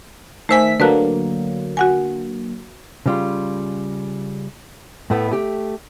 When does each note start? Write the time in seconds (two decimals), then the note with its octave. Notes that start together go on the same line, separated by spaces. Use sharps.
0.49 D#3 A3 C5 E5 G#5 B6
0.80 D3 F#3 A#3 B4 A5 F#6
1.77 F#4 F#5 G#5
3.06 C#3 G3 F4
5.10 A2 A3 B3
5.31 A3 G4